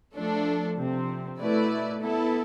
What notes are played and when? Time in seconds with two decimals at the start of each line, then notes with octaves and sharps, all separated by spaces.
0.16 F3 A3 D4 A4
0.78 C3 F3 C4
1.40 B2 A3 E4 B4 D5
2.02 B3 E4 A4